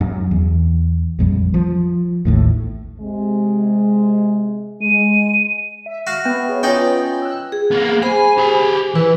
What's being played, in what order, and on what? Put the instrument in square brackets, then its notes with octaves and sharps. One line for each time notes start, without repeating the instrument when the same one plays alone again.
[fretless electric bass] F#2
E2
A#1 F2 G3
F3
A1 D#2 A2
[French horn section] C3 G#3
[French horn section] G#3 [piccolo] D#7
[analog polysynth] E5
[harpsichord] F#4 F5
[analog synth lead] B3 [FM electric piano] G5
[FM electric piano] G#4 C#5
[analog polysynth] C#4 F4 [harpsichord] D#4 D5 G5 [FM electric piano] C#5 G#5
[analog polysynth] E6 F#6
[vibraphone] G#4
[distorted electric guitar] A#3 B3
[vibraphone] G#4 C5 B5 [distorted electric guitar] G#5
[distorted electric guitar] G4 G#5
[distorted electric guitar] E3 [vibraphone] E4 B4